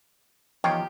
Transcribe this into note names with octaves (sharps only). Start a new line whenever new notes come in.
E2 D#3 F3 F4 G4 C#5 G5